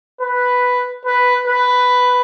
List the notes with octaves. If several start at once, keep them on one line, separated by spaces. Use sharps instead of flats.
B4
B4
B4